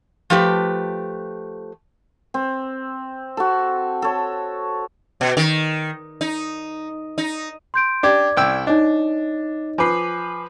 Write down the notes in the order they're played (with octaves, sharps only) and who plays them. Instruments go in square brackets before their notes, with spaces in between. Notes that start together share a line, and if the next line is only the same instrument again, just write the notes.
[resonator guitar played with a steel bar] F3 A3 G4 B4
[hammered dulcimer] C4
F#4 A4
A4 C#5
[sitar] B2
D#3
D#4
D#4
[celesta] C6 G6 D7
[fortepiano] D4 G4 [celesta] D5 D6 G#6
[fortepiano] C2 G5 E6
[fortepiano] D4 [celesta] D#4 C#5 D#5
[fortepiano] F3 B4 [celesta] G#5 D6 C7